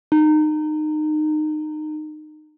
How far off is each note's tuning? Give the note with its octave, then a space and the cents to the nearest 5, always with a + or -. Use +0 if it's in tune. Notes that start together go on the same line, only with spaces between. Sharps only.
D#4 -25